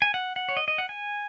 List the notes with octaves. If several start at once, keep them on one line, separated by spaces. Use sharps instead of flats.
G#5
F#5
F#5
C#5
D#5
D#5
F#5
G#5